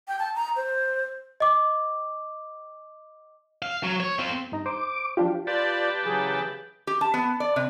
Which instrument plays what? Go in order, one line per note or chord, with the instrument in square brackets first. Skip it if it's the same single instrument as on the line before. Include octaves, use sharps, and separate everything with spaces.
[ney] G5
A5
A#5
C5
[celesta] D#5 D6
[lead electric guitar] F5
F#3
C#5
C4 F4
[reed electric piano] G2 D#4 A#5
[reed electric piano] C5 [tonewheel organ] D6
[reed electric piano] F3 D4 G4 [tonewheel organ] F4
[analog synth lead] F4 [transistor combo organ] G4 B4 A5 [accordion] D5
[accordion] C#3 E3 F#3 [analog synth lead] G#4
[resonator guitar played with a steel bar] G4
A5
B3
D5
C3